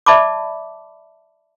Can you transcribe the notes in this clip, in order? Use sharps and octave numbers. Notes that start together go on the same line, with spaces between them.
D5 E5 A5 B5 D6